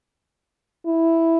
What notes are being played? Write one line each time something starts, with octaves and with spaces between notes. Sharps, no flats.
E4